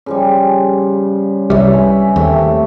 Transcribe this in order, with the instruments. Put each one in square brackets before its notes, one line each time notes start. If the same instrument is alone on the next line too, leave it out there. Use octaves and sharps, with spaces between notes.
[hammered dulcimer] C#3 F3 G3
[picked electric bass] C2 G3 [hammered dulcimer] B4 C#5 E5
[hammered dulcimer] G#5 B5
[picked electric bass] D#2 [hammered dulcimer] C3 A3